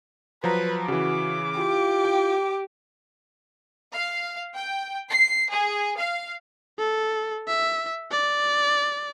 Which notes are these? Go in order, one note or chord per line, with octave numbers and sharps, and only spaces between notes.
F3 F#3 B4 A#5
C#3 E3 F#4 D6
E4 F4 G4
G5
F5
G5
C7
G#4
F5
A4
E5
D5